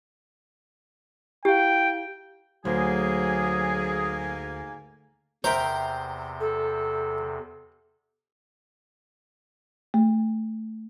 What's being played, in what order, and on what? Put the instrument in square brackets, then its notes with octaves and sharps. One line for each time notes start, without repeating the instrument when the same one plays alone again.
[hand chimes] E4 F5 [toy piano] G4 [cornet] G5
[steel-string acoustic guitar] D2 [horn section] G#2 A#3 G#5 [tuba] F#3 [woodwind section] G#4
[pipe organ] E2 C3 [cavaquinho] A#4 E5 G5 [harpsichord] C5
[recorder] A4
[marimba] A3